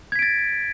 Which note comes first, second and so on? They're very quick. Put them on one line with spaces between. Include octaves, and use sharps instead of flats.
G#6 B6 D7 A6